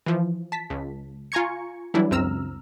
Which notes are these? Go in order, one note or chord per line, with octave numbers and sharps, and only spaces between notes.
E3 F3
A5 B6
C#2
F4 G#5 A#5 C#6 G#6 C#7
E3 F#3 G3 D4 E4
C#2 F#2 C4 A#5 E6 F6